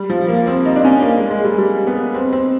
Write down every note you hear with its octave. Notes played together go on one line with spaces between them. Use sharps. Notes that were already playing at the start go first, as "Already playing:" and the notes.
Already playing: G3
F3
A#3
C4
D#4
D4
C#4
A#3
G#3
G#3
G3
G3
B3
C4
C4